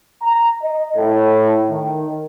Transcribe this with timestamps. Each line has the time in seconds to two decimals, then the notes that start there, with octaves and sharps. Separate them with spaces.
0.22 A#5
0.62 D#5
0.96 A2
1.70 D#3